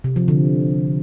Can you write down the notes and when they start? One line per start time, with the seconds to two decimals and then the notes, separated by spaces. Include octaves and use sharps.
0.04 C3
0.16 F3
0.28 D3